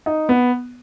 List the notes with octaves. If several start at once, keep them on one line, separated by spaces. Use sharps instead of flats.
D#4
B3